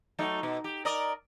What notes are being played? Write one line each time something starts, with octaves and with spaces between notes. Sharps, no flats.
F#3 A3 D#4
B2
G4
A#4 D5 D#5